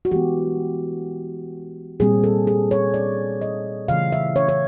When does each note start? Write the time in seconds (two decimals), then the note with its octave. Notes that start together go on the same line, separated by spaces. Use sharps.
0.05 F#4
0.11 E3 G#3 B3 G4
2.00 A#2 G3 C4 G#4
2.24 A4
2.47 G#4
2.71 C#5
2.94 D5
3.42 D#5
3.88 C#3 E3 A3 F5
4.12 E5
4.36 C#5
4.49 C#5